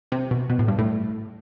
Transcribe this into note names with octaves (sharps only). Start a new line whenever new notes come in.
C3
B2
B2
A2
G2
A2